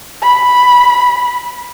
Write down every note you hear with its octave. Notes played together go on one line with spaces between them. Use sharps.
B5